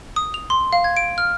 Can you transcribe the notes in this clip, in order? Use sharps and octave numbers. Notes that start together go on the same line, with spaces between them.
D#6
F7
C6
F5
G#6
D7
F6